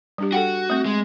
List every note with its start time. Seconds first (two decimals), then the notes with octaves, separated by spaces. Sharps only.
0.18 G3 D4 G4
0.32 F#4 A4 F#5 G5
0.70 A3 C4
0.86 G#3